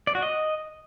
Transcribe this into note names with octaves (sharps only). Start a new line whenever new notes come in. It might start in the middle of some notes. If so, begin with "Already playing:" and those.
D5
F#4
D#5